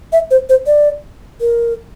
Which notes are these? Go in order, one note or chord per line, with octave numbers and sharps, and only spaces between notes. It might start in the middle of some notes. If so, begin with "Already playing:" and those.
E5
C5
C5
D5
A#4